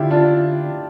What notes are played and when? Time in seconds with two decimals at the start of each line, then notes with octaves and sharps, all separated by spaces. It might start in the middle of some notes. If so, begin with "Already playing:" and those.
Already playing: D3 D4 E4 F4 G4
0.10 D4 F4